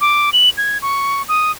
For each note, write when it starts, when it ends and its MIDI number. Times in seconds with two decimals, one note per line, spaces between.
0.01 0.30 86
0.33 0.50 102
0.57 0.78 92
0.82 1.22 85
1.29 1.52 87